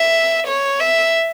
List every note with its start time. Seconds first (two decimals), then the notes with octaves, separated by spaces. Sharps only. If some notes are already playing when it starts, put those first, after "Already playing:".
Already playing: E5
0.47 C#5
0.80 E5